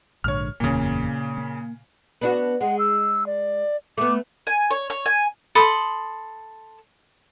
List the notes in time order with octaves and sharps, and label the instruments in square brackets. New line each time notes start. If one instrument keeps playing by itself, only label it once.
[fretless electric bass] A#1 G#2 D3 [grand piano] C#5 F6
[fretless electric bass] F#1 E2 [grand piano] A#2 C#3
[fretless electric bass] A#3
[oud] B3 D4 F#4
[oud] G#3 [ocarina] F#5
[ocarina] E6
D5
[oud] A3 B3 [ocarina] D6
[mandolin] G#5
C#5
C#5
G#5
[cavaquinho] A4 B5 C6 D#6